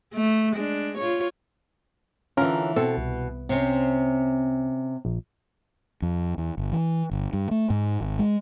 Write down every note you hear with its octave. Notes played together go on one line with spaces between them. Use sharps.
A3
G#3 D4
F4 C#5
D3 E3 C#4 F4 A#4
B2 C4 A4
C2
C3 C4 C#4
A#1
F2
E2
G1
E3
G1
G2
A3
G#2
G#1
G#3